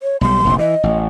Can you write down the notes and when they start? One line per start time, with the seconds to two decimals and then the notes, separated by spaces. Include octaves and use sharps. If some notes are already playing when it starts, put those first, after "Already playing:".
0.03 C#5
0.21 B1 G3 C6
0.45 F1 A#1 B2
0.59 E3 D#5
0.83 A1